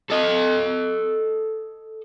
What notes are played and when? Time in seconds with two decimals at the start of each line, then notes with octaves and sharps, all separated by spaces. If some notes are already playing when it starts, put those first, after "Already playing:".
0.10 A4 D#5